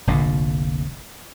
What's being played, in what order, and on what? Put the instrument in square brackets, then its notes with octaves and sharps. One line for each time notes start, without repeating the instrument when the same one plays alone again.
[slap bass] F1 A#1 A#2 D3